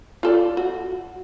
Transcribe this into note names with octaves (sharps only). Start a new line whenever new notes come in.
F4 A4 D5
F#4